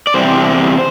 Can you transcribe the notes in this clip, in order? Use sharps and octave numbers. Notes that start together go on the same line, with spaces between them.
D5
E2 C3 G3 C4 C5